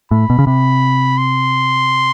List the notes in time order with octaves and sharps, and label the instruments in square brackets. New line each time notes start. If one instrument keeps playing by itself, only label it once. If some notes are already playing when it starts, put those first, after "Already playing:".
[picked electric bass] A2 [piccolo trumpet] B5
[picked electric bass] B2
C#3
[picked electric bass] C3 [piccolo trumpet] B5
[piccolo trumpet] C6